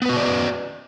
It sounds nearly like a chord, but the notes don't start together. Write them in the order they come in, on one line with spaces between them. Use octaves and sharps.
B3 B4 F#4 D#5 D5